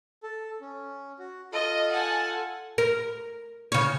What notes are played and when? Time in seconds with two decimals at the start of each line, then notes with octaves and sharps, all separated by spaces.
0.23 A4
0.61 C#4
1.19 F#4
1.53 F4 A4 D#5
1.92 F#5 G#5 A5
2.78 A#4
3.72 C#3 C#5